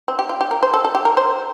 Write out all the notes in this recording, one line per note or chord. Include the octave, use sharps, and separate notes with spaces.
C4
G4
F4
G4
A#4
C5
A4
A4
G4
A#4
C5